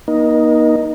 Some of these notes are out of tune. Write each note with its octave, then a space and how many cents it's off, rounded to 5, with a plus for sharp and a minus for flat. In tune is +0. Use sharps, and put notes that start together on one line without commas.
A#3 +40 D#4 +0